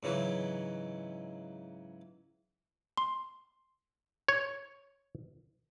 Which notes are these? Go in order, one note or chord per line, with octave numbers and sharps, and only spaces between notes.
G#2 C#3 E3 F#3
C6
C#5